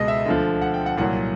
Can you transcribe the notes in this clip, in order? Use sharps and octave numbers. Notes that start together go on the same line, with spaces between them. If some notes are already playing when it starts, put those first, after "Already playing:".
Already playing: C#2 B2 G#3 D#5
E5
D2 D3 F3
F#5
G5
F#5
C2 A#2 F#3 F#5